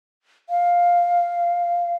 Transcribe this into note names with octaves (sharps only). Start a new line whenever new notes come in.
F5